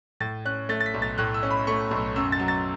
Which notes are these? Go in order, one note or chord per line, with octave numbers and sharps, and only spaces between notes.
A2 A6
C#4 F#6
A3 A6
A6
B6
B1
A6
A2 F#6
E6
C#4
B5
A3 C#6
B1
F#2 E6
A6
F#3
A6